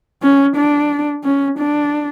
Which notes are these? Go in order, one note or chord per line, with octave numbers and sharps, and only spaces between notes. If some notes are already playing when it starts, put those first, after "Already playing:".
C#4
D4
C#4
D4